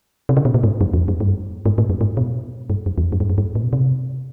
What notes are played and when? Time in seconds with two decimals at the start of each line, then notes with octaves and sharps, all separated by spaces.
0.29 C3
0.37 C#3
0.45 B2
0.54 A#2
0.64 G#2
0.81 F#2
0.94 E2
0.97 F2
1.08 F#2
1.20 G2
1.66 G#2
1.78 A2
1.90 F#2
2.01 G#2
2.17 B2
2.70 G2
2.86 F#2
2.98 E2
3.03 F2
3.12 F#2
3.20 G2
3.30 F#2
3.38 G2
3.55 A2
3.63 B2
3.73 C3